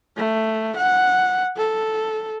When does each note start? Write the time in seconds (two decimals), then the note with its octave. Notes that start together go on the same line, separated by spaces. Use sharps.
0.17 A3
0.76 F#5
1.57 A4